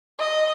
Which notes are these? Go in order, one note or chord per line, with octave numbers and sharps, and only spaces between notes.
D#5